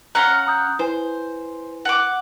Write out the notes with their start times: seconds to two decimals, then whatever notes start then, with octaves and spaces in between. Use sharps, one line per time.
0.15 C#4 F5 F#5 A#5 A#6 G7
0.47 A#5 D#6 G6
0.79 E4 B4 C5 G#5
1.85 F#5 D6